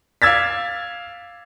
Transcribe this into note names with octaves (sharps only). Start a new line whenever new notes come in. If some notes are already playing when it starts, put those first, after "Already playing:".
F5 D6 E6 G#6 A6 B6